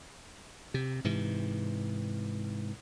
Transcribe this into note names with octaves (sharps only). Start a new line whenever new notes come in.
C3
G#2 C3 E3